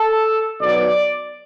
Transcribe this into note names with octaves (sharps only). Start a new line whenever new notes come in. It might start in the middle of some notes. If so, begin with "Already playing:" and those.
Already playing: A4
B1 B2 F#3 D5